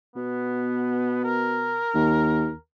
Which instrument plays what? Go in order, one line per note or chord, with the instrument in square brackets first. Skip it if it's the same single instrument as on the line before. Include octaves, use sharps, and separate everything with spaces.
[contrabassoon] B2 [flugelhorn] B3
[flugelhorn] A#4
[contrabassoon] D#2